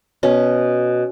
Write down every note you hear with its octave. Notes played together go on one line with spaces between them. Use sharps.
B2 C#4